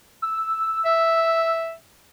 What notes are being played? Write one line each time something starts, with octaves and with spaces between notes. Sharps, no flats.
E6
E5